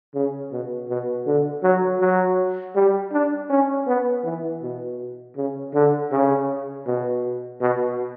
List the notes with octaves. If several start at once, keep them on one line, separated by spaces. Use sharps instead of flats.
C#3
B2
B2
D3
F#3
F#3
G3
D4
C#4
B3
E3
B2
C#3
D3
C#3
B2
B2